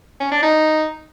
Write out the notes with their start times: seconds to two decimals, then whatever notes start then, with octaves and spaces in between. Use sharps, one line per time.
0.20 C#4
0.32 D4
0.43 D#4